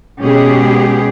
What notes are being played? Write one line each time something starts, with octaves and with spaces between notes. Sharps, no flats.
B2 G#3 C#4 G4 G#4